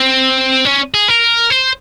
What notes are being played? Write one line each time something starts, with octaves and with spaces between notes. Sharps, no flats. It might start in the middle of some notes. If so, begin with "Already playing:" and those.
Already playing: C4
C#4
G#4
A#4
C5